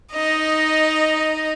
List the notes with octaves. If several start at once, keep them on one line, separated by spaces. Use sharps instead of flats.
D#4 D#5